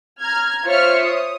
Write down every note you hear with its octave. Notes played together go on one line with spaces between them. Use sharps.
A#5 F6 G#6
F4 C5 C#5 E5 F6 C#7
D#6